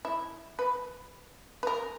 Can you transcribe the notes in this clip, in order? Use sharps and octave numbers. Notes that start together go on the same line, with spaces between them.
E4
B4
B4
A#4